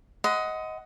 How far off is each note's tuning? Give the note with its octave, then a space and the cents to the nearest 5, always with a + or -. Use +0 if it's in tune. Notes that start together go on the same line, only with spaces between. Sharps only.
D#5 +20 F#5 +0 C6 -35